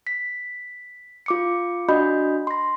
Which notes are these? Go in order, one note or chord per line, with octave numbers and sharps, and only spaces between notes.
B6
F4 D6 C#7
D4 F#4 D#5 B5 G6
C6 A#6